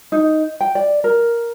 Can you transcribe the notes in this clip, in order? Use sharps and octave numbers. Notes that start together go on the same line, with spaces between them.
D#4
G5
D5
A#4